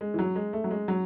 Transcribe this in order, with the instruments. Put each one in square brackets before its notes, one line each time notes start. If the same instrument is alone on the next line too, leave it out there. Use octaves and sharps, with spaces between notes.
[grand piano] G#3
E3
F#3
G#3
A3
F#3
G#3
F#3